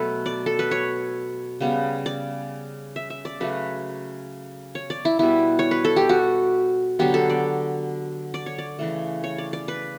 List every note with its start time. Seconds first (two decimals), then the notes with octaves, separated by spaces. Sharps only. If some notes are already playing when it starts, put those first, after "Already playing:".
Already playing: B2 F#3 A3 A4 B4
0.26 D5
0.46 A4
0.59 B4
0.71 C#5
1.61 C#3 G3 B3
2.06 D5
2.96 E5
3.10 E5
3.25 D5
3.40 C#3 F#3 A3 B4
4.75 C#5
4.90 D5
5.05 E4
5.19 B2 G3 B3 E4
5.59 C#5
5.71 B4
5.85 A4
5.96 G4
6.09 F#4
6.99 D3 F#3 B3 G4
7.14 A4
7.30 D5
8.34 D5
8.46 C#5
8.58 D5
8.79 C#3 E3 A3
9.24 C#5
9.38 D5
9.53 D5
9.68 B4